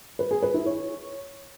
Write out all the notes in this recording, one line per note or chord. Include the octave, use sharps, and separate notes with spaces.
B4
G#4
B4
E4
C#5